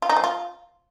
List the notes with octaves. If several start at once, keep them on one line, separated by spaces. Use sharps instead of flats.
F4
D#4
F3
F4